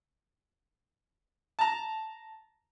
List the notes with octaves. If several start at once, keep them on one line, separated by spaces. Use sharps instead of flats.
A5 A#5